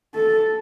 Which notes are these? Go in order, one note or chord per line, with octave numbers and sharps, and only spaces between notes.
A4